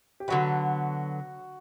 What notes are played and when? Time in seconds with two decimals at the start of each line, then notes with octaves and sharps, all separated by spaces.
0.20 G4
0.28 D3 F#3 B3 F#4